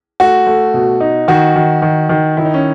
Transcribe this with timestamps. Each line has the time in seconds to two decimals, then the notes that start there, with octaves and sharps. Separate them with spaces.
0.20 A3 F#4
0.47 A3
0.74 B2
1.00 D#4
1.28 D#3 F#4
1.56 D#3
1.82 D#3
2.09 D#3
2.37 D#3 E4
2.45 D#4
2.54 C#4